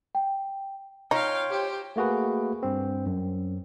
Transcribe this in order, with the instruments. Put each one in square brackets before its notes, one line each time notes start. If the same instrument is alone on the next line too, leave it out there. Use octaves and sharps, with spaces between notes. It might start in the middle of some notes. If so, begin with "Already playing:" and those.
[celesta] G5
[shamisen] D#4 [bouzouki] F4 C#5 [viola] F5 G5
[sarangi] G4 [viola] C5
[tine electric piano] A3 A#3 F#4 G#4 B4
G2 C4
F#2